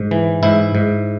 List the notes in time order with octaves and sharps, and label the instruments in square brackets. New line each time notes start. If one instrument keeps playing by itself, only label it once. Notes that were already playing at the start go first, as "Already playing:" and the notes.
Already playing: [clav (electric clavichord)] G#2
E3
G#2 E4
G#2